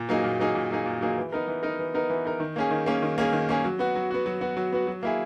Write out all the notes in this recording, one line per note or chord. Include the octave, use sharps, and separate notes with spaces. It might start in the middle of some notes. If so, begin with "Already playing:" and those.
Already playing: A#2
F#3 A#3 D#4 G#4
A#2
F#3 A#3 D#4 G#4
A#2
F#3 A#3 D#4 G#4
A#2
F#3 A#3 D#4 G#4
E3
B3 D#4 A#4
E3
B3 D#4 A#4
E3
B3 D#4 A#4
E3
B3 D#4 A#4
D#3
A#3 C#4 G#4
D#3
A#3 C#4 G#4
D#3
A#3 C#4 G#4
D#3
A#3 C#4 G#4
F#3
B3 F#4
F#3
B3 F#4
F#3
B3 F#4
F#3
B3 F#4
F#3
A#3 E4 G#4